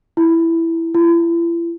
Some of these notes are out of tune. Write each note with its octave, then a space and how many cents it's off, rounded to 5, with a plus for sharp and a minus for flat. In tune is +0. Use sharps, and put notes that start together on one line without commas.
E4 +5
E4 +40